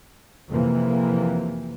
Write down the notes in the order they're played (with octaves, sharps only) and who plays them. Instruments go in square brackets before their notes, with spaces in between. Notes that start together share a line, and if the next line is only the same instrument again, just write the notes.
[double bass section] F2 C3 E3 A#3